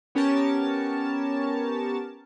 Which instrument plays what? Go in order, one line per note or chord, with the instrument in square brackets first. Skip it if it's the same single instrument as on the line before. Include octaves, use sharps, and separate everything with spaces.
[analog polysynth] B3 C#4 G4 A#4 C#5 A5